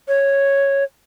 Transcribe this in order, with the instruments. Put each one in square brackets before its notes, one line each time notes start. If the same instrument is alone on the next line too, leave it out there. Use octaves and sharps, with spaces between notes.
[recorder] C#5